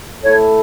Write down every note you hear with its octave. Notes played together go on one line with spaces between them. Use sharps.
A3 E4 A4 C#5